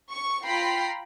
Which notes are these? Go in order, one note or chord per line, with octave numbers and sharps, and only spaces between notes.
C#6
F4 G5 A#5 B5 C7